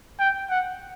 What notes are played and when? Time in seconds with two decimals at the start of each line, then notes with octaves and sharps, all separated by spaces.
0.20 G5
0.50 F#5